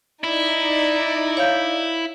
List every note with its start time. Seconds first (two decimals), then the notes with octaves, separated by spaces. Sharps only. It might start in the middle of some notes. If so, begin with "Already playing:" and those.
0.24 D#4 E4 D5
1.37 C#5 F5 G6